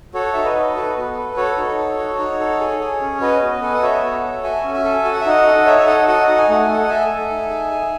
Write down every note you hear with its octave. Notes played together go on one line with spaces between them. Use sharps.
F#4 A4 C#5
D#4 E5
B4 D#5
A4
F#4 B4
B3
A4
F#4 A4 C#5
D#4
A4
F#4
D#4
A4
G#4
G#4
C#4
F#4 B4 D#5
B3
A4 G#5
F#5
F#4 C#5 E5
B3
A4
F#4 E5 G#5
C#4
E5 G#5
A4
F#4 G#5
F#5
E5
D#4 D#5 F#5
A4
D#4 C#5 E5
E5
A4 D#5 F#5
F#4 D#5 F#5
D#4 F#5
G#5
A3 F#5
G#5
A4 D#5 F#5
A4 E5 G#5
A4
D#4
G#4
G#4